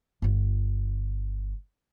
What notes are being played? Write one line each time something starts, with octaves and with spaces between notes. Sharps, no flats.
G1 F4